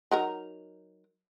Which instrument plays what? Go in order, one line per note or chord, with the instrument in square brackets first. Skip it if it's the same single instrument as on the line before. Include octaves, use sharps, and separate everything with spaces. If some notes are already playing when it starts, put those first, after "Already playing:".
[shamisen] F#3 D#4 A#4